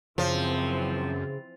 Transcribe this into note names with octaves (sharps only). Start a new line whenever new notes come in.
F#2 C#3 E3 F3 C4